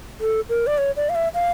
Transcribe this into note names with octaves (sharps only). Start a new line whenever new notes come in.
A4
A#4
D5
C#5
D5
F5
E5
F5